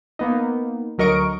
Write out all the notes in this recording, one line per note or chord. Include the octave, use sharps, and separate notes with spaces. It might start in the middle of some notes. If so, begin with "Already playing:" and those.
A#3 B3 D#4
D2 F#3 A#4 D#5 C#6 D7